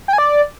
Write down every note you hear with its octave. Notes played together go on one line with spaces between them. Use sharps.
G5
G#5
D5